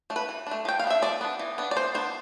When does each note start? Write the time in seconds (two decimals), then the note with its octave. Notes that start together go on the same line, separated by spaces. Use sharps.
0.10 A3 D4
0.16 B4
0.29 E3
0.47 A3 D4
0.65 F3 G5
0.79 F5
0.84 B3
0.87 D4 E5
1.02 F3 D5
1.21 B3 D4
1.39 E3
1.58 B3 D4
1.71 D5
1.76 E3 C5
1.94 B3 D4 C5